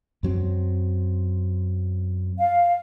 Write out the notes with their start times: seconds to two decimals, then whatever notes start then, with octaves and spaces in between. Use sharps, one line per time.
0.23 F#2 F#3 C4
2.38 F5